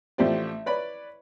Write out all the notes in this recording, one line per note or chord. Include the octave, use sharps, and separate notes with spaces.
A1 F3 G4 C5 D5
B4 C#5 D5 B5